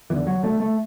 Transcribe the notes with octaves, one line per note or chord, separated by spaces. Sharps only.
E2 D3 E3
F#3
D2 D3 A3
A3